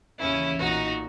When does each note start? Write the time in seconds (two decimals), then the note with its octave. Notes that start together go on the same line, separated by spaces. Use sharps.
0.20 D#2 C#3 E3 C#4 E4
0.60 B1 A#2 D#4 F#4